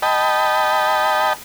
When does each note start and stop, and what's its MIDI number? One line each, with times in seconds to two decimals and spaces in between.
0.02 1.33 75
0.02 1.33 79
0.02 1.33 81
0.02 1.33 83